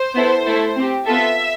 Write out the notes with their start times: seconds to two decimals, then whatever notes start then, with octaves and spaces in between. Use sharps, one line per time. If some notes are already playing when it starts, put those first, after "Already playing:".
Already playing: C5
0.14 B3 E4 A4
0.45 A3 E4 A4
0.75 C4 G4
1.06 B3 F4 A4 E5